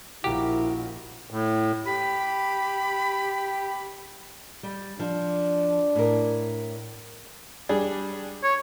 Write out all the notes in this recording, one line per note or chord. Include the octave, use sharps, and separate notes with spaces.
A#1 E4 F#4 G4 A#4 F5
A2
G4 B5
G3
F3 D4
A2 A#4
G3 D4 G#4
C#5